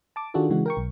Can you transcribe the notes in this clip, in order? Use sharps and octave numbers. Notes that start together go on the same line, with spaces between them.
A5 D6
D#3 D4 F4 F#4 G#4 A4
C#3 E3 G#3 F#4
A#4 G5 C#6
B1